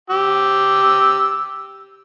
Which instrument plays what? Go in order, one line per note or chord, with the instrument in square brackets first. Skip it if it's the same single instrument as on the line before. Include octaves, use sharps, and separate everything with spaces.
[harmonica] G4 E6